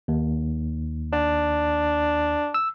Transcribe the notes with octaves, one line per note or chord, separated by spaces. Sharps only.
D#2
D4
E6